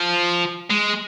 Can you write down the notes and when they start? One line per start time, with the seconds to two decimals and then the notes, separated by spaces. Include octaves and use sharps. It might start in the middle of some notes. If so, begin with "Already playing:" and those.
Already playing: F3
0.70 G#3